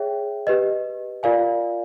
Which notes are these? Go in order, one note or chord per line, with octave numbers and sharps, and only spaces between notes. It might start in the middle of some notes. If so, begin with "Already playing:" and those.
Already playing: G#4 C#5 E5 G5
G4 B4 D#5
F4 A#4 D5 F5 G#5